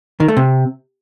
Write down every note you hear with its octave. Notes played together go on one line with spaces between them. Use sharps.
D#3
A3
C3